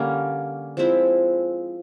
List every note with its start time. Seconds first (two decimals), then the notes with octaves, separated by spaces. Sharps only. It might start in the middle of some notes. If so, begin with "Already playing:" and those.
Already playing: D3 G3 A#3 C#4
0.77 F3 G#3 C4 E4